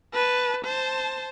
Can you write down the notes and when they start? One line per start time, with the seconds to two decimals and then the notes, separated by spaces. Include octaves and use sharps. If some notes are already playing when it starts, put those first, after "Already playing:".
0.14 B4 A5
0.65 C5 A5